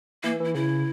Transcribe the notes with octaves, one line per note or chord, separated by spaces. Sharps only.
E3 A#3
E3 E4
C#3 E4